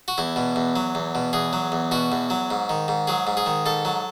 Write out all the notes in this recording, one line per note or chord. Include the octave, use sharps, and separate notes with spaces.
F#4
E2 E4
B2
E2
F#3
E2
B2
E2 G#4
F#3
E2
B2 F#4
E2
F#3
G#2
D#3
G#2
F#3 G#4
G#2
G#4
D#3
G#2 A4
F#3